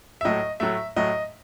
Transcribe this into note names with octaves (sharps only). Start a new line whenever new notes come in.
E5
A2 F#3 A3 D#5
A2 F#3 A3 E5
A2 F#3 A3 D#5